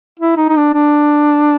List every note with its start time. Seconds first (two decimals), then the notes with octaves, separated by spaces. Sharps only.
0.20 E4
0.37 D#4
0.49 D#4
0.56 D4
0.74 D4